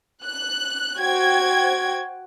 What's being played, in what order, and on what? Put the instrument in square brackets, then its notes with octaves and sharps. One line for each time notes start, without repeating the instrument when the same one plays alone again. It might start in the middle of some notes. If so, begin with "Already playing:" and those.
[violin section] F#6
[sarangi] F#4 [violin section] C5 G5 G#6